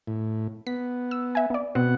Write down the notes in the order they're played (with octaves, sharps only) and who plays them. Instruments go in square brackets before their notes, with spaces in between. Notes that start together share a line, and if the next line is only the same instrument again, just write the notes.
[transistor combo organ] A2
[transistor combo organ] B3 [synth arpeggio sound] B6
[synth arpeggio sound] E6
E5 G#5
B3 D5
[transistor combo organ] B2 B3 F#5 [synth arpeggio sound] C4